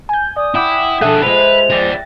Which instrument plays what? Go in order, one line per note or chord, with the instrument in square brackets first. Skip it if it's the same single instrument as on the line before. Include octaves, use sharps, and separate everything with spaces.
[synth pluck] G#5 G6
[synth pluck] D5 [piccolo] D#6
[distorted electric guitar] E4 [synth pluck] F#5 G5 D6
[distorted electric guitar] D4 G#4 [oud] A4 [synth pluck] E5 F#6
[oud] F3 G#3 [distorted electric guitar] B4 [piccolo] F7
[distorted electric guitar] G#4 D5 [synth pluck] G5 A6 A#6